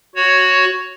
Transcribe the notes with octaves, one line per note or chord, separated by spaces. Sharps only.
F#4 C#5